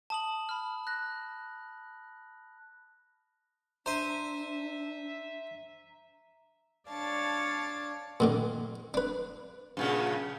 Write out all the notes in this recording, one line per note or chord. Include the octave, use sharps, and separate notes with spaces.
A5 D#6 F#7
B5 F6
F#6 A#6
D4 C5 E5 A#5 D#7
D4 C#5 D5 F5 A5
A#2 D3 D#3
D4 B4
G2 A#2 C#3